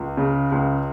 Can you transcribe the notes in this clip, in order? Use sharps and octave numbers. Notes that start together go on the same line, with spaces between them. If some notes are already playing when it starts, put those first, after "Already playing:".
Already playing: C#2
C#3
C#2